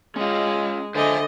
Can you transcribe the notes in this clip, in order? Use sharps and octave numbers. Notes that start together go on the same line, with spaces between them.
G#3 C#4 F4
D3 C5 D#5 E5 G#5